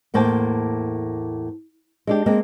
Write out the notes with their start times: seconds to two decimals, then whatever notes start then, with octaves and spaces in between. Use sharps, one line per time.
0.14 E2 A2 A#3 C5 G5 A5
2.07 G#3 D4 G4
2.26 G#3 A#3 C4